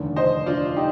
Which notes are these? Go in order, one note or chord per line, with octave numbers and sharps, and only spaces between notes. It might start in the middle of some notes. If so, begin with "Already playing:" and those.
Already playing: F1 D#2 D3
C5 D#5
D4 F4
D#4 G4